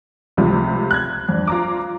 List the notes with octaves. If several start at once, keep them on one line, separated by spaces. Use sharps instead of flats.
C#2 C3 F3 A3
F#6 G#6
F2 D4
F4 A#5 D6